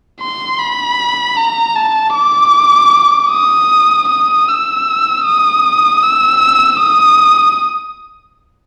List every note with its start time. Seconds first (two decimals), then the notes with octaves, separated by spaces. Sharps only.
0.20 C6
0.59 B5
1.37 A#5
1.76 A5
2.15 D6
3.31 D#6
4.09 D#6
4.48 E6
5.25 D#6
6.03 E6
6.81 D#6